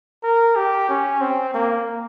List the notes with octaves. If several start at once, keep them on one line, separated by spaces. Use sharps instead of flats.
A#4
G4
C#4
C4
A#3